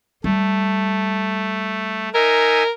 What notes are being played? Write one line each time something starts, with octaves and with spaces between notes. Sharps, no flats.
G3 A3
D#4 A#4 E5 G#5